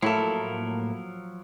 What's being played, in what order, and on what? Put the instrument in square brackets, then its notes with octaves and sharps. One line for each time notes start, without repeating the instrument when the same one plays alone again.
[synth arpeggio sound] A2 A#3 [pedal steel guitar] F3 F#3 A#4 [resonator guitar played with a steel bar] E4 A4